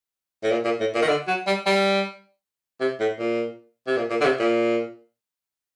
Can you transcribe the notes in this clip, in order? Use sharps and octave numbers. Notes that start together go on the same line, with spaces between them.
A2
A#2
A#2
A2
A#2
D#3
D3
F#3
G3
G3
C3
A2
A#2
C3
A#2
A#2
D3
C3
A#2